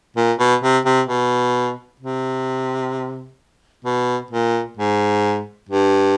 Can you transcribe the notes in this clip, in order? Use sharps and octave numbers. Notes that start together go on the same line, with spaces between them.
A#2
B2
C3
C3
B2
C3
B2
A#2
G#2
G2